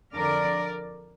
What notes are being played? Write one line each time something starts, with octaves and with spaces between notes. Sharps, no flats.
F2 D3 A#4 D5